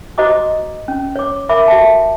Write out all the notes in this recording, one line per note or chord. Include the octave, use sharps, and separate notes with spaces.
F#4 C5 D#5 A#5 D6 D#6
C#4
C#5 D6
A#4 E5 B5 D6
F#4 E5 A5